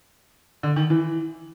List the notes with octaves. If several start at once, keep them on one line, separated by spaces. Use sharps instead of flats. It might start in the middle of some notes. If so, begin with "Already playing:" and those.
D3
D#3
E3